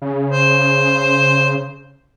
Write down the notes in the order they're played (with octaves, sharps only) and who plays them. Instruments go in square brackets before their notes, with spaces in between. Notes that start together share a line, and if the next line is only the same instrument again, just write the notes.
[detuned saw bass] C#3
[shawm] C5